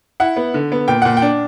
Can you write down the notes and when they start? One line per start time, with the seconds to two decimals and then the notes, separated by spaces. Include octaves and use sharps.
0.20 E4 F#5
0.36 B3
0.54 D3
0.72 B3
0.88 A#2 G5
1.02 A#2 F#5
1.17 G5
1.22 D4